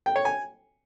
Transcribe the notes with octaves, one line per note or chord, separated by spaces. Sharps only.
G5
C#5
G#5